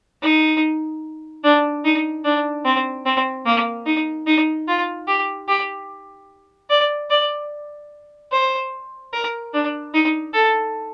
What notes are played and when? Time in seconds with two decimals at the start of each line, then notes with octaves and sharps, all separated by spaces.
0.22 D#4
1.44 D4
1.84 D#4
2.25 D4
2.65 C4
3.06 C4
3.46 A#3
3.86 D#4
4.27 D#4
4.68 F4
5.08 G4
5.48 G4
6.70 D5
7.10 D5
8.32 C5
9.13 A#4
9.53 D4
9.94 D#4
10.34 A4